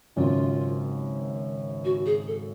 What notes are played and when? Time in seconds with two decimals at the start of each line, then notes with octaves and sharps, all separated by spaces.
0.16 G#1 F#2 C#3 F4
1.84 F#4
2.06 G#4
2.27 A4